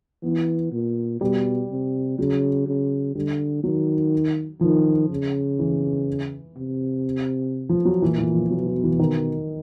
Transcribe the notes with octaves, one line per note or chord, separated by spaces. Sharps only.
E3 B3
A#2
B2 G3
C3
C#3 F#3
C#3
D3 G3
D#3 F#3
D#3 F3
C#3
E3
C3
F3
F#3
A#2 E3
E3
F3
B2 F#3
F#3
E3
D#3